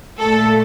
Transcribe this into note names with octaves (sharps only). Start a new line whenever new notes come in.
A#2 A3 A4